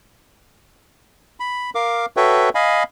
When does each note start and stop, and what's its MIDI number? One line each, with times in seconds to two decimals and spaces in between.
1.40 1.70 83
1.75 2.06 70
1.75 2.06 77
1.75 2.06 86
2.17 2.49 66
2.17 2.49 69
2.17 2.49 71
2.17 2.49 73
2.17 2.49 76
2.17 2.49 79
2.55 2.83 75
2.55 2.83 77
2.55 2.83 80
2.55 2.83 83